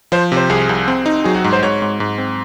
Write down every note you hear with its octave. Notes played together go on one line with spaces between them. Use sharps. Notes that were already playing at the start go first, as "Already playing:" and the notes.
F3 C5
C3
C5
C2 G#4
C2
C4
D#4
F#3 G#4
F#4
G#2
C5
G#2 C#5
G#2
G#2
C4